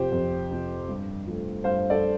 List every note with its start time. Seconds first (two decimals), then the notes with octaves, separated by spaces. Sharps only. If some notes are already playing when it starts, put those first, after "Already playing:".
Already playing: F2 C3 F3 G4 C5
0.12 F2
0.50 C3 F3
0.89 G2
1.27 F3 A3
1.64 G2 C5 F5
1.90 A4 D5